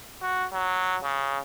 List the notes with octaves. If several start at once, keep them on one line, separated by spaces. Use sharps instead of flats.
F#4
F#3
C#3